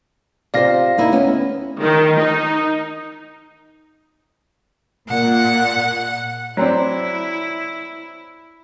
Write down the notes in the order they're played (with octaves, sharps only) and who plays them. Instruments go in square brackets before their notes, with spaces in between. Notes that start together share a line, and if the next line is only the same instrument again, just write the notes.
[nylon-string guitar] C3 F4 C5 [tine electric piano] D5 F5 A#6
[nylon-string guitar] A#3 D#4 E4
D2 B3 C#4
[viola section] D#3
D#4
[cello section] A#2 [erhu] F#5
[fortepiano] F#3 C4 D4 [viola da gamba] E4